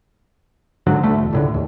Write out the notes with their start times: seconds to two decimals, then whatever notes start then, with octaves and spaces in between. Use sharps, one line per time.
0.87 G#2 D3 F#3
1.04 D2 A3
1.18 E1
1.33 C#2 A2 D3
1.54 D#2